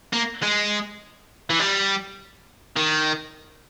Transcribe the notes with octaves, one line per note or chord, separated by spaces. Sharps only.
A#3
G#3
E3
G3
D#3